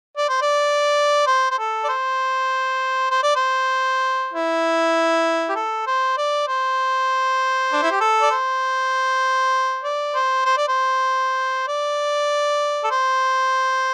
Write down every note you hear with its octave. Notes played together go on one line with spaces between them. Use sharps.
D5
C5
D5
C5
C5
A4
D5
C5
C5
D5
C5
E4
G4
A4
C5
D5
C5
D4
E4
G4
A4
D5
C5
D5
C5
C5
D5
C5
D5
A4
C5